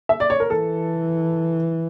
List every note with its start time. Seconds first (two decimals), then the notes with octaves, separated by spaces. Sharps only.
0.09 E5
0.20 D5
0.30 C#5
0.40 A#4
0.50 E3 A4